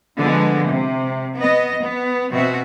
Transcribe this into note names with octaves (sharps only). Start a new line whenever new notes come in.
D3 F3 G#3 B3
C3
B3 D#5
B3
B2 C4 F#4 E5